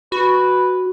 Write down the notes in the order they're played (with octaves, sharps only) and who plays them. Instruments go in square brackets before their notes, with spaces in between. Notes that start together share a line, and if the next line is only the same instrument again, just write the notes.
[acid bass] F#4 [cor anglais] B4